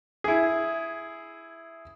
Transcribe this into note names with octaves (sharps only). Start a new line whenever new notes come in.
E4 G#4